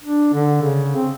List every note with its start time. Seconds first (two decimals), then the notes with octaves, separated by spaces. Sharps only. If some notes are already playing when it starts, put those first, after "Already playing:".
0.03 D4
0.33 D3
0.62 C#3
0.96 C4